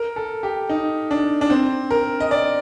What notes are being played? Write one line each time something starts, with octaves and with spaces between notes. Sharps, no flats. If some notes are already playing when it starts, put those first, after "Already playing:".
Already playing: A#4
A4
G4
D#4
D4
D4
C4
A#4
D#5
D5